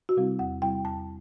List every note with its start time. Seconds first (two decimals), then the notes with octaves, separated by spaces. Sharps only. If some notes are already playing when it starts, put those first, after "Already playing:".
0.09 F#4
0.17 C3 G3 C4 E4
0.39 E2 F#5
0.62 C3 G3 C4 E4 G5
0.84 E2 A5